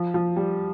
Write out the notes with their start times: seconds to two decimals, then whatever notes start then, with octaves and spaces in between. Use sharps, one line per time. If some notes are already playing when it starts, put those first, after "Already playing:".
Already playing: F3
0.14 F3
0.36 G3